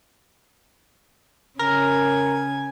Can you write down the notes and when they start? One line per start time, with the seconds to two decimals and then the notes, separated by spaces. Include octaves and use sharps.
1.59 C#3 A#4 G#5